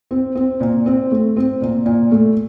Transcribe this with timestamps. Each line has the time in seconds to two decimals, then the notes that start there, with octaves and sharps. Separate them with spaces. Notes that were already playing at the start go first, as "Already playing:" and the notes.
0.11 C4
0.35 C4
0.60 A#2
0.86 C4
1.12 A3
1.37 C4
1.62 A#2
1.86 A#2
2.12 A3